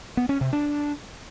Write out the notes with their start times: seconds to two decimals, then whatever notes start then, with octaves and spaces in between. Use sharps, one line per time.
0.17 B3
0.29 C#4
0.41 C3
0.53 D4